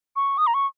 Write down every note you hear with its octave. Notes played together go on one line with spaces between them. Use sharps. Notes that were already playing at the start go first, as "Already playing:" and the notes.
C#6
D#6
A#5
C#6